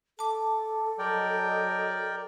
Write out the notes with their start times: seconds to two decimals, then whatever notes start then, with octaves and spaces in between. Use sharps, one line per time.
0.19 A4 A5 D6
0.99 F#3 A#4 D5 D#5 G5